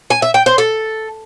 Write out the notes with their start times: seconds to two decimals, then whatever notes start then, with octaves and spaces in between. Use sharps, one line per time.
0.10 G#5
0.22 E5
0.34 G5
0.46 C5
0.58 A4